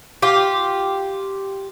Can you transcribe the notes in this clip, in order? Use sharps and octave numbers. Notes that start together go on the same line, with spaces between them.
F4 G4